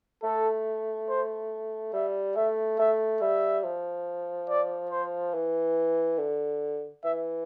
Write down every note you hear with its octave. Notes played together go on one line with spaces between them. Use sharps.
A3 A4
C5
G3 E5
A3 E5
A3 E5
G3 E5
F3
D5
C5
E3
D3
E3 E5